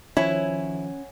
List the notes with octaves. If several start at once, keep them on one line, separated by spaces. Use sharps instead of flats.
D#3 F3 C#4 E4 C#5 F#5 G#5